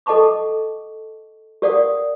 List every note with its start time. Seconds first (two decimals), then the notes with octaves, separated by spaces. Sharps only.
0.06 A4 D#5 F#5 A5 C#6 D6
1.62 G4 A#4 D5 F5 F#5 D#6